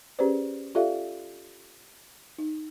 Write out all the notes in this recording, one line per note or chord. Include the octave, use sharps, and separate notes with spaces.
C#4 G4 G#4 B4 C5 D5
F4 G4 A4 D5 E5 F5
D#4